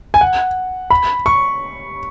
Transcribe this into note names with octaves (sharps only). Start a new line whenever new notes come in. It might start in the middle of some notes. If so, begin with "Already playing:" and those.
G#5
F#5
B5
C#6